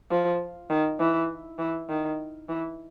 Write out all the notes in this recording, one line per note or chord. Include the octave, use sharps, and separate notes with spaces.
F3
D#3
E3
E3
D#3
E3